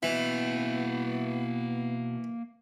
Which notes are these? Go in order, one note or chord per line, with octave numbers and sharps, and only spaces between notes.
B2 E3 A#3 B3 E5